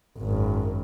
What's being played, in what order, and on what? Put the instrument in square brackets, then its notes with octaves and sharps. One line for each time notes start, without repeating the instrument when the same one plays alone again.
[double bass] G#1 F#2